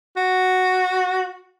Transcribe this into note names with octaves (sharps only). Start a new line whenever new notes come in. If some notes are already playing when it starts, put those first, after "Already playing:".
F#4